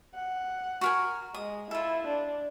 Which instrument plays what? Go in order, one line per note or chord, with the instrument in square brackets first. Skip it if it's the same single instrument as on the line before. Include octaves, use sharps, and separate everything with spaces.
[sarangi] F#5
[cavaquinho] F#4 A#4 G#5
[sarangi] G#3 [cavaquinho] D#6
[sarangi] E4 [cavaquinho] F4 A4
[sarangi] D4